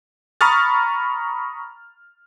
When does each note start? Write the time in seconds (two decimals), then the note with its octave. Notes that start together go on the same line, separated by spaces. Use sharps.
0.41 A#5 B5 C#6 D#6 F6 A6